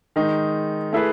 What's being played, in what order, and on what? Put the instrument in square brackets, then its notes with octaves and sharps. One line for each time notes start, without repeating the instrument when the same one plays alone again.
[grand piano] D#3 G#3 D#4
A3 E4 G#4 B4